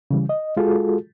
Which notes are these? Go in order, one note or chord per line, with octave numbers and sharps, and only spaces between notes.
C#3 E3 G3
D#5
G#3 F4 F#4 G#4 A4